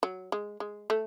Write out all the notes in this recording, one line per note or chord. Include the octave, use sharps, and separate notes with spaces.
F#3
G#3
G#3
A3